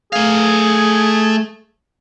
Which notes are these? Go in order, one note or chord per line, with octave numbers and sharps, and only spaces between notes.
A3 G#4 F5